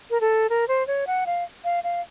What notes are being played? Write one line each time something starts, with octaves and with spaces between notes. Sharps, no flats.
A#4
A4
A#4
C5
C#5
F#5
F5
F5
F5